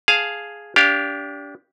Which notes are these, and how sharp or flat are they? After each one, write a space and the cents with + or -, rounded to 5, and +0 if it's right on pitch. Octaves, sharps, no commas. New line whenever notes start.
G#4 +0 F5 +0 A5 +0
D4 -30 G4 +0 F5 +0